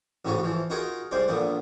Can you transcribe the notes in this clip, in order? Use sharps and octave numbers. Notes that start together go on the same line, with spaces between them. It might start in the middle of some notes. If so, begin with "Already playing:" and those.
A1 G#2 C#3 C#4 F#4
E3 F3
D#4 F4 F#4 G#4 A#4 D#5
C2 G#3 C5 D5
A#1 A#2 D3 B3